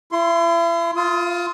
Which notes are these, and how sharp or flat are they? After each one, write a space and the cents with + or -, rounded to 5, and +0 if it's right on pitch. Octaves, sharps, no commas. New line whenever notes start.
E4 +40 C6 +0
F4 +0 D#6 +35